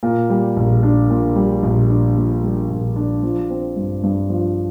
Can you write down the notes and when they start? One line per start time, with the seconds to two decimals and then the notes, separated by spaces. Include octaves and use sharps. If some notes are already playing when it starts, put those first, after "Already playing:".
0.03 A#2
0.30 G3
0.57 A#1
0.83 D4
1.10 A#2
1.36 G3
1.63 A#1
1.90 D4
2.17 A#2
2.43 G3
2.70 A#1
2.96 D4
3.23 F3
3.50 C4
3.76 G2
4.03 G2
4.30 F3